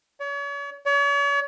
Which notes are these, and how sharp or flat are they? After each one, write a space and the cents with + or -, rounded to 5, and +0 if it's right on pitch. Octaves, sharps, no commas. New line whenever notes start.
C#5 +40
C#5 +40